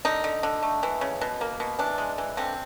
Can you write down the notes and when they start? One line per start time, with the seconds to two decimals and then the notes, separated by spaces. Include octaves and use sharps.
0.05 D3 D#4
0.24 D3
0.43 D3
0.63 A3
0.83 E3
1.01 C#3
1.21 B2
1.41 A#3
1.60 B2
1.79 E3 D4
1.98 G#3
2.18 E3
2.37 D3 C4